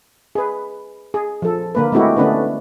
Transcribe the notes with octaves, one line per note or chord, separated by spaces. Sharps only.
G#4 B4
G#4
F3 A4
D3 A#3 B4
G#3 A3 C4 E4 F#4 G4
D3 A3 B3 C#4 D4 B4